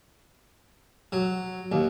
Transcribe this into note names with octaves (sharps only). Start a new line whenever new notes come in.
F#3
D#2